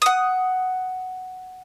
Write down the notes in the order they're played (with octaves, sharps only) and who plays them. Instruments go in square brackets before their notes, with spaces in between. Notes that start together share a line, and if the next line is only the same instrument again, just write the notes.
[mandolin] F#5 D#6